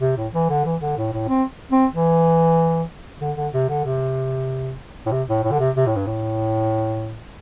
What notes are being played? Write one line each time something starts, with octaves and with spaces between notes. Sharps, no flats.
C3
A2
E3
D3
E3
D3
A2
A2
C4
C4
E3
D3
D3
C3
D3
C3
A2
C3
A2
A2
D3
C3
C3
A2
G2
A2